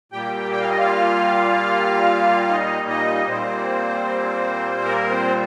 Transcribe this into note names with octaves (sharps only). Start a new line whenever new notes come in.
A#2 G3 A#3 G4 G5
G5
F5
D#5
F4 F5
D#4 D#5
D#4 D#5
A#2 G3 A#3 C4 C5
A#3 A#4
C4 C5